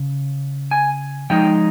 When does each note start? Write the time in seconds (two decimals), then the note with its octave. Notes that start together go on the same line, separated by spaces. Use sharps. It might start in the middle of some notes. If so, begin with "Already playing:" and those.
Already playing: C#3
0.71 G#5
1.30 F3 G#3 D#4 G5